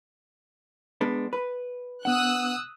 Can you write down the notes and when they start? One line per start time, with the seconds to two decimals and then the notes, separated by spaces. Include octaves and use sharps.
1.01 G#3 B3 D4
1.33 B4
2.05 B3 D4 F#5 D#6 E6 F#6